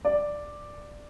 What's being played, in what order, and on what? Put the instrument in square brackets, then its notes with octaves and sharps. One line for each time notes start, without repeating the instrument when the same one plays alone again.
[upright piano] D5